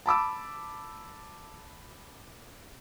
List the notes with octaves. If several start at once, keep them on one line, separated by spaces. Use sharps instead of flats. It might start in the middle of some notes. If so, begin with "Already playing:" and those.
A5 B5 D6 E6